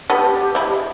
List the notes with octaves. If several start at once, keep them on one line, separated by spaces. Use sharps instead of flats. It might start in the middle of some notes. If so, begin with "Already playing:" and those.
B3 G4 A4
G#3 E4